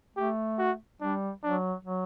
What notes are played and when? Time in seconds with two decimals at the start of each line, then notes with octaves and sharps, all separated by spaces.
0.16 A3 G4
0.58 F#4
1.01 G3 D4
1.43 F#3 D4
1.85 F#3